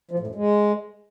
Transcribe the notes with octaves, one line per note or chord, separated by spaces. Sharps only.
F3
A2
F#2
G#3